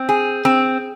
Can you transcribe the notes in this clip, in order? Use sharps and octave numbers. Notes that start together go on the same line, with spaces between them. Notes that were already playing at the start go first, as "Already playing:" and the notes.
Already playing: C4
G#4
C4